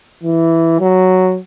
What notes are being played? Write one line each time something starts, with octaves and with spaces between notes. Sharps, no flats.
E3
F#3